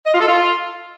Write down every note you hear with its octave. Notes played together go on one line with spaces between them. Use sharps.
D#5
F4
A4
F4